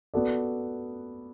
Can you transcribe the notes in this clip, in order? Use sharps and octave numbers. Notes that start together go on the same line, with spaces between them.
B3 F#4 A4 D5